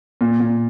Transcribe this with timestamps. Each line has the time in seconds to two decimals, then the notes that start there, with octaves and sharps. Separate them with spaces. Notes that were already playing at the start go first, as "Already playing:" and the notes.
0.21 A#2
0.40 A#2